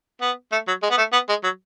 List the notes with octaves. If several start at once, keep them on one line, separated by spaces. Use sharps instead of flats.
B3
A3
F#3
G#3
B3
A3
B3
G#3
F#3